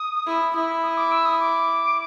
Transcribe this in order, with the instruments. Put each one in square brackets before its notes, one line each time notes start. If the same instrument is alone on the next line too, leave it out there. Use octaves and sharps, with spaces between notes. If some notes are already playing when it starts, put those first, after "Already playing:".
Already playing: [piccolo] D#6
[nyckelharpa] E4
E4
[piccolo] D#6
D6
E6
D#6
D6